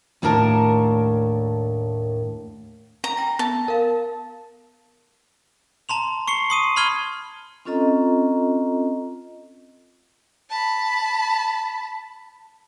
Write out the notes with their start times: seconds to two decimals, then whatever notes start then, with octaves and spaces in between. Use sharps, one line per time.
0.22 D#2 A2 D4 A#4 A5
3.04 A#5
3.17 G5 A#6
3.39 B3 A5
3.68 A#4 F5
5.89 A5 A#5 C6 F7
6.28 C#6 C7 C#7 G7
6.50 C6 D#6 D#7
6.76 B5 C6 F6 G#6 D#7 G7
7.65 C4 C#4 F4 A4 D#5 A#5
10.50 A5 B5